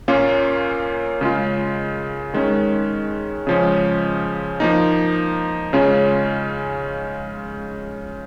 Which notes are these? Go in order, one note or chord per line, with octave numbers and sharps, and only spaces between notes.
A#2 A#3 C#4 F4
C#3 G#3 F4
D#3 G#3 C#4
C#3 F3 G#3 C#4
F3 A#3 D#4
C#3 G#3 C#4 F4